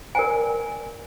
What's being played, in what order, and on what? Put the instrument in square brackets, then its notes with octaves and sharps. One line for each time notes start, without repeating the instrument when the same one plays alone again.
[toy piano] A#4 D5 G5 G#5